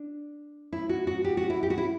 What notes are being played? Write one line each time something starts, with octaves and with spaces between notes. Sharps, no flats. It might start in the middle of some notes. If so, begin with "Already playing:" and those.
Already playing: D4
E4
F#4
F#4
G4
F#4
E4
G4
F#4
E4